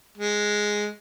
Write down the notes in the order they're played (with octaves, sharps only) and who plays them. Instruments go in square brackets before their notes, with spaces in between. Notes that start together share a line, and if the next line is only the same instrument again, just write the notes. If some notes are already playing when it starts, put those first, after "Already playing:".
[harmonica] G#3